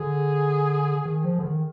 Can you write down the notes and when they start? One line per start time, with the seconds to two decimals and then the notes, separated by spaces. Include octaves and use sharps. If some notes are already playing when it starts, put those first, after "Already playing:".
Already playing: D3 G#4
1.05 D#3
1.24 F3
1.39 D3
1.44 D#3